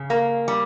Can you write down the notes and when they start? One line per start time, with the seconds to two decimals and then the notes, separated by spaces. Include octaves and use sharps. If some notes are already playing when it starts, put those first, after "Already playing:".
Already playing: C#3
0.10 A#3
0.48 G3